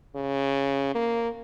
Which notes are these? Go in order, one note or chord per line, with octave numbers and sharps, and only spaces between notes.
C#3
A#3